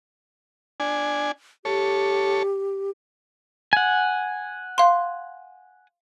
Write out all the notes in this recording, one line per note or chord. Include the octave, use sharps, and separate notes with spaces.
D4 G#5
G4 A4 C#5
F#5 G#5
F5 C6